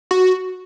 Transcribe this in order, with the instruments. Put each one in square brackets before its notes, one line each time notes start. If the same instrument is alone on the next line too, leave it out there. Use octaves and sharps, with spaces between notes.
[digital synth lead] F#4